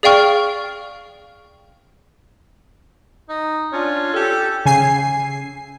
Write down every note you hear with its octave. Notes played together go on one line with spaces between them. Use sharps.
G#4 D5 F5 G5 C#6 F6
D#4
C#4 D4 F4
G4 A4
C#3 G#5 C7